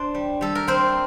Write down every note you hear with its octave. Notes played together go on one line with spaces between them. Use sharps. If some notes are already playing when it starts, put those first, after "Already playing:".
Already playing: D4 C5 D5
G3
G3 A4
A#4
C4 C5